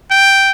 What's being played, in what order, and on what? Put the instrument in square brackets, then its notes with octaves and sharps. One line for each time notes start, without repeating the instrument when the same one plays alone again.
[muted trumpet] G5